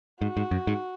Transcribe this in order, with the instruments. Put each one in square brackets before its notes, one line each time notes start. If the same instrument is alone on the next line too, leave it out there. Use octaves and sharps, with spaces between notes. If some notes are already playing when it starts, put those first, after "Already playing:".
[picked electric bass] G#2 [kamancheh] F#4
[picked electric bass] G#2
F#2
G#2